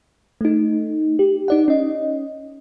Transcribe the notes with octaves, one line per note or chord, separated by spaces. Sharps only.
A3 D#4
G4
D#4 D5 F#5
C#4 D#5